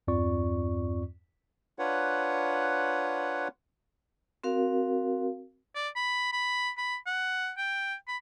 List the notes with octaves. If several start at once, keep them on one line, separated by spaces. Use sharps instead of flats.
E2 G2 C4 F4 D5 C#6
D4 F4 B4 C#5 F#5
C4 F#4 A#4 F5
D5
B5
B5
B5
F#5
G5
B5